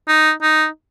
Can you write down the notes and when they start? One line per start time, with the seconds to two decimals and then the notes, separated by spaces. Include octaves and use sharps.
0.08 D#4
0.42 D#4